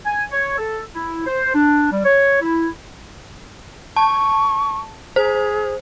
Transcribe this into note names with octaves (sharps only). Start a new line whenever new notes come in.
G#5
C#5
A4
E4
C5
D4
G3
C#5
E4
A5 C#6
G#4 C5